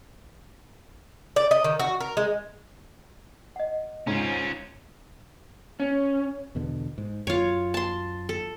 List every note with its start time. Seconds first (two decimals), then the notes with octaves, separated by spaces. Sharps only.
1.36 D5
1.51 D#5
1.64 D#3
1.79 F#4
2.00 A#4
2.17 G#3
3.56 D#5 F#5
4.07 G#2 C#4 F4
5.80 C#4
6.55 E2 B2 D3
6.98 G#2
7.27 F#2 F4 C#5
7.74 A5 C6
8.29 A4